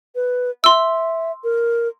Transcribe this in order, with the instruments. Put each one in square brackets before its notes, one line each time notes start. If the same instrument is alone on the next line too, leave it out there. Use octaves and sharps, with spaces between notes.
[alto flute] B4
[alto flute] E5 [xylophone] C6 E6
[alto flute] A#4